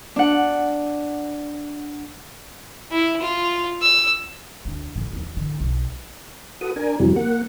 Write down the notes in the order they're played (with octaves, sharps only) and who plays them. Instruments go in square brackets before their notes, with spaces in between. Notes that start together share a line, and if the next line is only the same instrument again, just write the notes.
[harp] D4 F#5
[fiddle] E4
F4
E6
[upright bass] D2 D4
A1 A2
D#2 D#3
A2 D3
B1
[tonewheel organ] F#4 A4 B4 D#6
D4 A#4 G#5
F2 C3 E3 F#3 G3
A#3 F#5